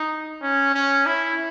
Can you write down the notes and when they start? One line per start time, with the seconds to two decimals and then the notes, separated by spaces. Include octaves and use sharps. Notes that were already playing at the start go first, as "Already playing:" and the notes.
Already playing: D#4
0.42 C#4
0.74 C#4
1.06 E4